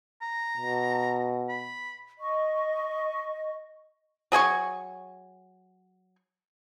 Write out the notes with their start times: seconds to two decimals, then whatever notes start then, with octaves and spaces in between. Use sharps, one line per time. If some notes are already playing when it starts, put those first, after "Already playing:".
0.22 A#5
0.57 B2
1.49 B5
2.19 D#5 C#6
4.32 F#3 G#4 G#5 C#6